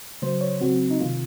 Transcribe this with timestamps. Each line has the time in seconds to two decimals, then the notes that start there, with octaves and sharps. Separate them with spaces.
0.22 C#3 F#3 A#3 C5
0.41 C#5
0.61 C#3 F#3 C4 F#4
0.91 D#4
1.00 C3 D#3 A#3 F4